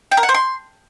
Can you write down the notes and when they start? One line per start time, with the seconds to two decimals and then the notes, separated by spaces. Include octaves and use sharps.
0.12 G5
0.17 A#4
0.23 F#5
0.29 C5
0.34 C6